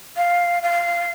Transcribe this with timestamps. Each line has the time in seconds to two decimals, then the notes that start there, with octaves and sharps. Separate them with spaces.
0.17 F5
0.63 F5